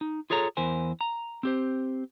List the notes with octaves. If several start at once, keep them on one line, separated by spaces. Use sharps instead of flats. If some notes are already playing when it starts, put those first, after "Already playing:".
D#4
F4 G#4 A4 C#5 A#5
E2 E3 A#4 C5 G#5
A#5
C4 G4 C5